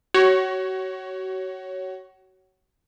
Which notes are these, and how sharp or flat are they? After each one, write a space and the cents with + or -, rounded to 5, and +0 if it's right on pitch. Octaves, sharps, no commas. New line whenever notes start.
F#4 +30 C#5 +0